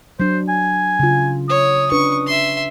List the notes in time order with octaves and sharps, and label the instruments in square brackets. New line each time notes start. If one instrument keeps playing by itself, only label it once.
[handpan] F#3 D4 [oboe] C5
[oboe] G#5
[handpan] C#3 F4
[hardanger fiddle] C#5 [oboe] D#6
[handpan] C#4 D4 B4 [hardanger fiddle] C#6
[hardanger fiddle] E5 C6